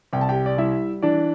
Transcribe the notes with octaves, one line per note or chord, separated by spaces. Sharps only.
C2 G5
A5
G4 G5
D5
G3 E4 E5
E3 D4 D5